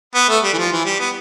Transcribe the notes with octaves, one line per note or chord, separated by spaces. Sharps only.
B3
A3
G3
E3
F3
E3
G3
B3